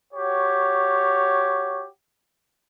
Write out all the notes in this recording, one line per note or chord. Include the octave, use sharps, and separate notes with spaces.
F#4 G4 C#5